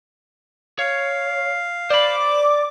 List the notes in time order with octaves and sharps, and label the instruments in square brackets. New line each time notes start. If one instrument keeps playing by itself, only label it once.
[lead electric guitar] C#5 [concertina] F5
[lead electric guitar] C5 B5 [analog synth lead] D5 [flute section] D6